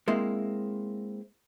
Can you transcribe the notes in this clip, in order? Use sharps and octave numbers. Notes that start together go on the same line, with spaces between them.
G#3 A#3 C4 E4